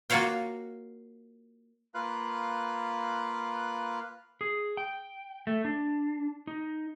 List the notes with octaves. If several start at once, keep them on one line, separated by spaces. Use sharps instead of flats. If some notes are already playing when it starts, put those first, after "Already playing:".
A#3 F4 F#4 C#5 F5 G5
A#3 F4 B4 F5 F#6
G#4
G5
A3
D4
D#4